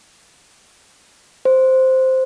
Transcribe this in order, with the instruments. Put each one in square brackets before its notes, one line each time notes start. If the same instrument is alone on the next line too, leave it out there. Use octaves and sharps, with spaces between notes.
[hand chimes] C5